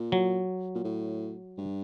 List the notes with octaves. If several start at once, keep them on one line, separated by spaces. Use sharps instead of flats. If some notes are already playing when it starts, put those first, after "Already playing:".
Already playing: A#2
F#3
A#2
A2
G2